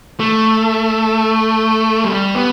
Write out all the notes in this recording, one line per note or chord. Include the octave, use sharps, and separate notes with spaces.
A3
G3
B3